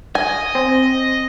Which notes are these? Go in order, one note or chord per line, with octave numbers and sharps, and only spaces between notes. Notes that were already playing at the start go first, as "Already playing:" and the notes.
D#5 G#5
C4